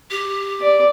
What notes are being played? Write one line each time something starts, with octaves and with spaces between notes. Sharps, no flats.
G4
D5